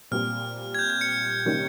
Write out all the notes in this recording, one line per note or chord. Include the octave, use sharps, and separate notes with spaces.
A#2 G3 C4 F6
G#6
G6
G6
C#7
C3 D#3 G3 A#3 C#4